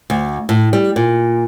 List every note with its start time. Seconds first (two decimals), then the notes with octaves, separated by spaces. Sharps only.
0.10 D2
0.49 A2
0.73 G3
0.96 A#2